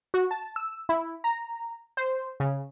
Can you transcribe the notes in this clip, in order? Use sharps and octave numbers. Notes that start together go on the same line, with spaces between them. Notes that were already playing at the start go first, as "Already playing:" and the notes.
F#4
A5
E6
E4
A#5
C5
C#3